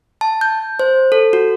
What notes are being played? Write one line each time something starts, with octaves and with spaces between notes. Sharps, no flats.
A5
G6
C5
A4
F#4